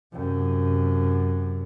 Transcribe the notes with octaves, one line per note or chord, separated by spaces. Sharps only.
F#2 C3